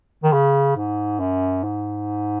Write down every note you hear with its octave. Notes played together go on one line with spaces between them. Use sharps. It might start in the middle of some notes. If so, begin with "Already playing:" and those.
D#3
C#3
G#2
F#2
G#2